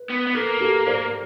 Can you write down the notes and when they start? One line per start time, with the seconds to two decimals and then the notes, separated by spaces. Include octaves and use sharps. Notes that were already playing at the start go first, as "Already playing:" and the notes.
Already playing: B4
0.10 B3
0.27 B3
0.35 A#3 A4 B4
0.60 G4 A4
0.87 C5 D5